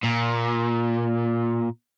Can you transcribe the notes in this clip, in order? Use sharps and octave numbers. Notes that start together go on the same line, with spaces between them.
A#2